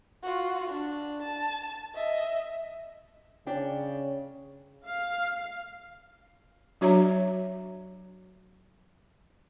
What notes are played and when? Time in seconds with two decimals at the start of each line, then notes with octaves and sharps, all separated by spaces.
0.23 F4 F#4
0.68 D4
1.22 A5
1.95 D#5 E5
3.47 C#3 C#4 D4 G5
4.86 F5
6.81 F#3 D4 F#4 C#5 E5 A#5